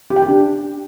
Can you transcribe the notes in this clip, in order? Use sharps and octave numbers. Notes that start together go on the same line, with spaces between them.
G4
G5
G4
D4